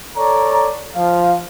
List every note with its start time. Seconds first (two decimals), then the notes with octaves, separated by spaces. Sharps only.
0.16 A4 C#5 D5 A#5
0.95 F3 F5